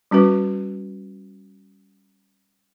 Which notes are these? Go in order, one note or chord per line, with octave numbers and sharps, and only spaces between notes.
G3 C#4 F#4 B4